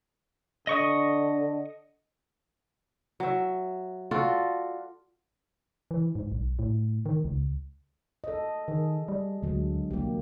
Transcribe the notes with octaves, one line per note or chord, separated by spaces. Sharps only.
D3 D#5 C#6 D#6
F#3 E5
F4 F#4 A4 D5
E3
G#2
B1
A2
D#3
C#2
A4 D#5
D#3 G#4
G3
D2 D3 F#3 G#3
C2 A#3 G4